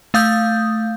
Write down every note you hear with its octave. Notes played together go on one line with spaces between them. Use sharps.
A3 F5 D#6 G6